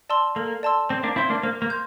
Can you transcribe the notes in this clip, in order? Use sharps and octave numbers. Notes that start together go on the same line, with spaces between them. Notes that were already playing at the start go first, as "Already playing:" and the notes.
D5 A5 C6 E6
A#3 A4
D5 A5 C6 E6
C4 C5
A#3 D4
C4 E4 F5 C6 G6
A#3 D4
A#3 C5
A#3
C6 G6